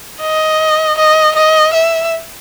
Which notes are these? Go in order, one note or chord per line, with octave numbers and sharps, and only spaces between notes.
D#5
D#5
D#5
E5